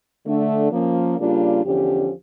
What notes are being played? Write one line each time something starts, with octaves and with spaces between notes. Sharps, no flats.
D3 A3 D4
F3 A#3 C#4
C#3 G3 A#3 D4 F4
E2 D3 F3 C#4 G4